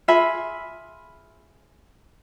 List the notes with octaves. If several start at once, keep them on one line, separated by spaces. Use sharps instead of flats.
F4 G#4 E5 B5